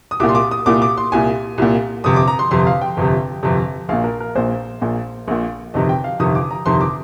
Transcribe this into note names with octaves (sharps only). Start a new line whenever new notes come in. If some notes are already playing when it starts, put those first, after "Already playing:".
D#6
C2 A#2 D6
C6
D6
D#6
C2 A#2 D6
D6
C6
C2 A#2 G#5
C2 A#2
G1 F2 C3 D#6
D6
A#5
C6
G1 F2 C3 C6
F5
G5
G1 F2 C3
G1 F2 C3
A#1 A#2 F5
A#4
A#4
A#1 A#2 C5
A#1 A#2
A#1 A#2
G1 F2 C3 D#3 D#5
G5
F5
G1 F2 C3 D#3 D#6
D6
A#5
G1 F2 C3 D#3 C6
D6